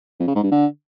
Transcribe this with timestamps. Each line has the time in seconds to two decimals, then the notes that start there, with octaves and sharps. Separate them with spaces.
0.20 F2
0.28 C#3
0.36 G#2
0.44 G2
0.51 D3